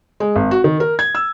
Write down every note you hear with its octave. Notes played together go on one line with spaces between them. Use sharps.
G#3
G#1
F#4
D#3
A#4
G#6
E6